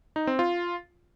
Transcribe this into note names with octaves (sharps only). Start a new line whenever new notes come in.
D#4
C4
F4